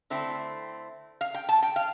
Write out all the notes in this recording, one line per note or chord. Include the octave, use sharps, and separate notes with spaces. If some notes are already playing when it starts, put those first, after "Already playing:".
D3 A3 C4 E4
F5
G5
A5
G5
F5